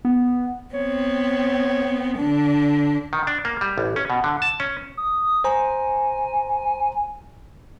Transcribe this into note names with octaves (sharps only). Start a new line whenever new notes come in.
B3
B3 C4 C#5
D3 D4
D#3
D4
A#3
G3
A1
C#4
B2
D3
A5
C#4
D#6
C5 G#5 A#5